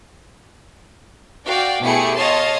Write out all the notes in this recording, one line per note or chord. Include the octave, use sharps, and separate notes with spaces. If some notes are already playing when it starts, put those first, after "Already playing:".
F#4 D5 F5 G5
B2 A3 E4 G4 G#4 C#7
C#5 D#5 F5 A5 C6